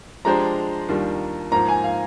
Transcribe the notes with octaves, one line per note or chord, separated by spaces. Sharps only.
F3 G#3 D4 G4 C5 A#5
D#2 D#3 G3 D4 F4
G#2 F3 A#3 A#5
G#5
F5